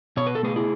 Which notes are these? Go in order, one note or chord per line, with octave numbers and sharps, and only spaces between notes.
B2 C#5
B4
A4
A3 G#4 B4
E4 G#4